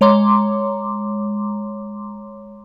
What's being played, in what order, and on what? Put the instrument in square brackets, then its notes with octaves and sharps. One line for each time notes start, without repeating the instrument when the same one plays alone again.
[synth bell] G#3 C#5 A#5 C6 D6